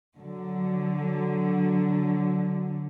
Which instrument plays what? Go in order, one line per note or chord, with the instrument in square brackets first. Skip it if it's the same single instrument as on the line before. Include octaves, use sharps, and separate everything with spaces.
[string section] D3 F#3